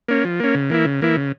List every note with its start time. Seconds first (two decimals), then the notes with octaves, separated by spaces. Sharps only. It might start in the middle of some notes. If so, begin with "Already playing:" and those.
0.08 A#3 C#4
0.25 F3
0.40 A#3 C#4
0.55 C#3
0.70 E3 A#3 E4
0.85 C#3
1.02 E3 A#3 E4
1.17 C#3